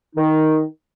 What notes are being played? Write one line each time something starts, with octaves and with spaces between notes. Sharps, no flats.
D#3 D#4